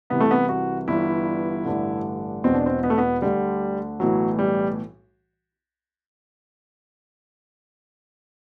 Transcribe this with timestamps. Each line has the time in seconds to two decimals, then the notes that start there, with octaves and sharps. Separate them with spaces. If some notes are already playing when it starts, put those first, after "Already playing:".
0.10 C2 C3 E3 B3
0.20 A3
0.31 B3
0.49 F#4
0.88 G1 G2 E3 E4
1.65 A1 G2 D3
2.44 E1 E2 B2 C4
2.55 D4
2.66 C4
2.83 B3
2.90 A3
2.98 B3
3.22 D2 D3 G3
4.00 B1 A2 E3 F#3
4.39 G3